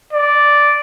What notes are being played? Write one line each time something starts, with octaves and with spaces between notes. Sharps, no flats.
D5